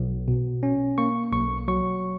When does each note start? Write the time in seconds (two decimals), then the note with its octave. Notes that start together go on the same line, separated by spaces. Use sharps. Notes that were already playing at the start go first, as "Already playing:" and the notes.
Already playing: B1
0.28 B2
0.63 C#4
0.98 A#3 C#6
1.33 B1 C#6
1.68 F#3 C#6